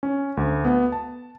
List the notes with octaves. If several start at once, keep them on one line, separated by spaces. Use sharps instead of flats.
C#4
D2
B3
A5